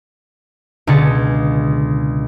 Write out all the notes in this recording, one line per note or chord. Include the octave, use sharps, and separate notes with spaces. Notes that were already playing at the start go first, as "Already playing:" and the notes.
C#2 B2 D3 G#4 A6 C#7